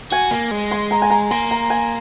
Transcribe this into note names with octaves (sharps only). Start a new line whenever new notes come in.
F#4 G#5
A#3
G#3
C6
A#5
G#5
A#5
A#3 C6
A#5
G#5